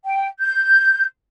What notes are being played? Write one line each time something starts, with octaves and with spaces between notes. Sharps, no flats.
G5
G6